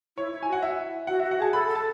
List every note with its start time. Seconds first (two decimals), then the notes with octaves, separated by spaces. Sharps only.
0.17 E4 C#5
0.33 E4
0.43 F#4 G#5
0.53 F#5
0.62 E4 E5
1.07 F#4 F#5
1.20 E5
1.24 F#4
1.31 F#5
1.38 G#4 A5
1.53 A4 B5
1.68 A4
1.75 A5